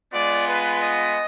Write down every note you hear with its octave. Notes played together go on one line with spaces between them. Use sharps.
G#3 B3 F4 D5
B4
D#5